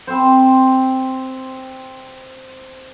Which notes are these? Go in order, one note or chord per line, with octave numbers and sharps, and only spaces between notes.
C4 C5